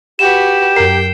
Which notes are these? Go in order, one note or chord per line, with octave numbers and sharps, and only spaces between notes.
F#4 G4 B4 E7
F#2 A#4 G5 C7